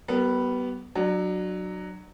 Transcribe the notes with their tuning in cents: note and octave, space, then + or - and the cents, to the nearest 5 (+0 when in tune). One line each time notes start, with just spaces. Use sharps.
G3 -40 B3 +0 A#4 -30
F#3 +0 D4 +35